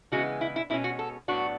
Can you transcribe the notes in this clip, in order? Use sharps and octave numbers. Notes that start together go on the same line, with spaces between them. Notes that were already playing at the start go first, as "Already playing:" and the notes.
C#3 E3 G#3 B3 F#4
E4
E4
B2 G#3 C#4 E4
F#4
A4
A2 F#3 B3 D4 F#4